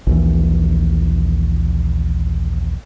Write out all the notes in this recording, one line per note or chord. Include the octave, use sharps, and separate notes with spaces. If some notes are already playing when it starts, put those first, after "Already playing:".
A#1 D#2 E3